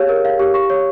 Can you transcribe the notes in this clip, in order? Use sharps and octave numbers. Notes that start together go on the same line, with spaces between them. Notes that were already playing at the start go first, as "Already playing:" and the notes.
Already playing: G4 G#4 C#5 F5
A#4
F5
G4
C#6
C#5